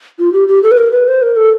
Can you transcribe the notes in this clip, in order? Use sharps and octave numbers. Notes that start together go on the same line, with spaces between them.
F4
G4
G4
A4
B4
A#4
B4
C5
A#4
A4